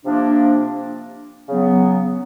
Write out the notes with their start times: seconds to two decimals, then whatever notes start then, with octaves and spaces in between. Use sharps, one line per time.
0.04 C3 F3 A#3 D4
1.49 C#3 F#3 B3